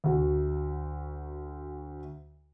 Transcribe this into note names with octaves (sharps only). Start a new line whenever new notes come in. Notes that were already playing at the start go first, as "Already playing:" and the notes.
D2 F#4